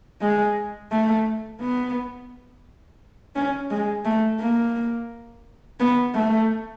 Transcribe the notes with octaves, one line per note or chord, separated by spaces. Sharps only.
G#3
A3
B3
C#4
G#3
A3
A#3
B3
A3